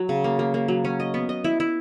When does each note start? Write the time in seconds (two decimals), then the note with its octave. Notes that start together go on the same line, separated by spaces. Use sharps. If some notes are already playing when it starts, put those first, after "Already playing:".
Already playing: F#3
0.09 C#3
0.24 A#3
0.39 A#3
0.54 A#3
0.68 F#3
0.85 C#4
1.00 D#5
1.14 B3
1.29 D#5
1.44 E4
1.60 E4